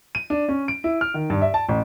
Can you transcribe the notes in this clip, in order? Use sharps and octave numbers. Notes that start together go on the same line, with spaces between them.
D#7
D4
C#4
D7
E4
F6
D#3
G2
E5
A5
A1